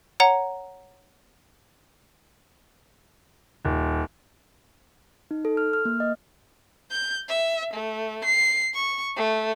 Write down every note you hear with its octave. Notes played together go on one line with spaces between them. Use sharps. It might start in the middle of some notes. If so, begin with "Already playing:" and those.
C#5 F#5 A#5
D#1
D#4
A4
F6
F6
A#3
D#5
G6
E5
A3
C7
C#6
A3